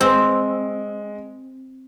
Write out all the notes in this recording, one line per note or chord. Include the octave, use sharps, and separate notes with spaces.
G#3 C4